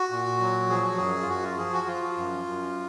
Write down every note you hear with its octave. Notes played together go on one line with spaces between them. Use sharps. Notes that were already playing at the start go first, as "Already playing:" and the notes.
Already playing: F#4
A#2
F#3
F3 G#4
F#4
F#2 G#4
F4
F#2 F#4
F4
F3 G#4
F#4
F3 F4
F#2
F#2